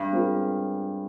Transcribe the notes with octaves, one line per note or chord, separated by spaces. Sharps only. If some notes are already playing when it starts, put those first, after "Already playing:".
Already playing: G2 G#3 C4
G#3 C4 F4 A#4